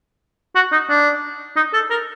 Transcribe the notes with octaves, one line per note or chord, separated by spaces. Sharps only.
F#4
D#4
D4
D#4
A4
A#4